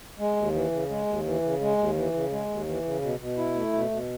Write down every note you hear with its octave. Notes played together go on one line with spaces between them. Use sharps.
G#3
D#2
E3
C#3
G#3
D#2
E3
C#3
G#3
D#2
E3
C#3
G#3
D#2
E3
C#3
B2
B2
E4
A3
B2
B2